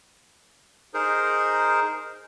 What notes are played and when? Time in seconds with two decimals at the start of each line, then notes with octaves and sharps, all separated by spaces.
0.94 D#4 G#4 A#4 C5